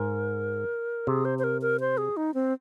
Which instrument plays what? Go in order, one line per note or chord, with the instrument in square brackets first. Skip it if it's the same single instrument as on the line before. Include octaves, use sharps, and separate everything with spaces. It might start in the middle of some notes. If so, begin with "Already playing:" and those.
Already playing: [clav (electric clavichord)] G#2 [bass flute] A#4
[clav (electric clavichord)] C3 [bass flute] G#4
[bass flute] C5
C5
A#4
A#4
C5
G#4
D#4
C4